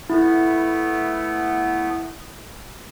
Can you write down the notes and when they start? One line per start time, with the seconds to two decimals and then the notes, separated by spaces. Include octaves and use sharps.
0.10 A3 B3 E4